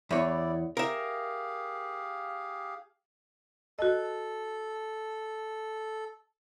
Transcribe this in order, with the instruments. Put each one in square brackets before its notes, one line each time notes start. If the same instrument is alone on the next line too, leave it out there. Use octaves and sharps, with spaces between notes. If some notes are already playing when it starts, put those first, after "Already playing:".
[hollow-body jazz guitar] E2 C#5 [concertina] E4 D5
[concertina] G4 G#4 F5 [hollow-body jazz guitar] A#4 E5
[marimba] F#4 D#5 [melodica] A4